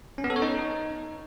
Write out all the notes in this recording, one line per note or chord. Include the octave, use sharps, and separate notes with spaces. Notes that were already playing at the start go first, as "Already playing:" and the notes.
C#4
B3
A4
C#5
D#4